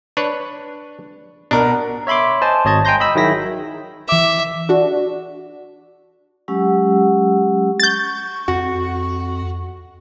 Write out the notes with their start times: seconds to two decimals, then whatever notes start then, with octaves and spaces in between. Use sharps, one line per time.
0.17 D4 B4 C#5
1.51 B2 D4 A#4
2.07 C#5 E5 B5 C6 D6
2.42 C5 D#5 G#5 A5
2.65 G#1 C#5 D#5 A5 G#6
2.85 G5 G#5 A#5 C6 G6 A#6
3.00 D#5 B5 E6
3.15 D#3 F#3 E4 G#4 A#6 B6
4.09 E3 E5 D6
4.69 D4 F#4
6.48 F#3 G#3 C#4 G4 F#5 E6
7.80 C#6 G6 A6
8.48 F2 F#4